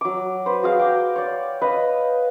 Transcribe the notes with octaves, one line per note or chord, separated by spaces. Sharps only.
F#3 D6
B4 C5
F#4 G#4 F5
G5 A#5 D6
C#5 D5
B4 D#5 F5